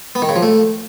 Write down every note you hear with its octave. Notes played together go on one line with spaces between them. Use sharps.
B3
D#3
C#3
F3
A3